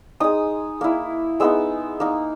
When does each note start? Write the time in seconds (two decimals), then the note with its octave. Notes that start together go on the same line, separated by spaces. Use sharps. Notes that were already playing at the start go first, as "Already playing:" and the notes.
0.20 G#3 D#4 D#6
0.81 A#3 E4
1.40 G#3 B3 D#4 E6
2.00 A#3 D#4